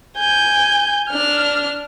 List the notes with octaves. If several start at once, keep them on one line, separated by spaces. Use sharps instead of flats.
G#5 G6
D4 F6